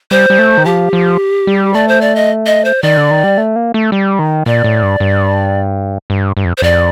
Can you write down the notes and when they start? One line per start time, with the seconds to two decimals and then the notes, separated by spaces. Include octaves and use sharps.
0.11 G3 C5
0.30 G3
0.39 A3
0.58 D#3
0.65 F3 G4
0.93 F3
1.47 G3
1.74 A3 D5
1.88 C5
2.01 D5
2.16 D#5
2.46 D#5
2.65 C5
2.82 D#3 D5
2.97 D3
3.11 D#3
3.24 G3
3.38 A3
3.56 A#3
3.74 A3
3.92 G3
4.19 D#3
4.46 A#2 D5
4.64 A2
4.83 G2
5.00 G2
6.10 G2
6.37 G2
6.45 F2
6.58 C5
6.62 F2 D5